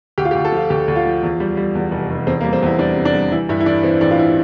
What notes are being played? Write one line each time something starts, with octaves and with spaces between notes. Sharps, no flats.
D2 G4
F4
G4
D2
A4
F3 F4
D2 G4
D2
F4
F3
E2
G3
G3
E2
F1
F1
E2 C4
A#3
G3
C4
E2 E4
G3 D4
C3
D4
G3
E3 E4
G2 E4
E4
E3 D4
E3 C4
A1 D4
F4
E4